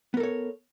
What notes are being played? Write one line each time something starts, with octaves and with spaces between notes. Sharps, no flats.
B3 A4 A#4 C#5